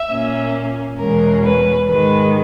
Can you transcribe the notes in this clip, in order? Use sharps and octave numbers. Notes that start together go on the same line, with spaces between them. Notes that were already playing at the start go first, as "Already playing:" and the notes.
Already playing: E5
A#2 A#3 C#4
E2 B2 G#3 C#4 A#4
B4
G#2 D#3 G#3 B4